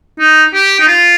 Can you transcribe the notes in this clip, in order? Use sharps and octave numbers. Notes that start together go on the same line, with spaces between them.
D#4
G4
D#4
F4